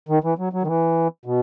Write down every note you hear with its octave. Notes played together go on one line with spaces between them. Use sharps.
D#3
E3
F#3
F#3
D#3
E3
B2